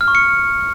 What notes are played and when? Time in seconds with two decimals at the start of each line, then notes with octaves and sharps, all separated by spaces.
0.01 F6
0.08 C#6
0.15 C#7